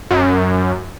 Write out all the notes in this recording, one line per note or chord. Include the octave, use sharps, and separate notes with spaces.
F#2